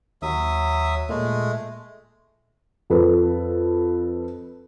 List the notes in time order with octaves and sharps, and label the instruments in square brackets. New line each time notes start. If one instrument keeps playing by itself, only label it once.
[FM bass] D#2 [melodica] F#3 E5 D#6
[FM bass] A#2 [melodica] G#3 A3
[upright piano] F2 A4 B4